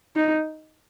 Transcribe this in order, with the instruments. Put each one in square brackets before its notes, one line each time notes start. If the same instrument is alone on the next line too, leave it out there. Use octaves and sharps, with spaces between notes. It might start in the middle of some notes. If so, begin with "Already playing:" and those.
[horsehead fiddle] D#4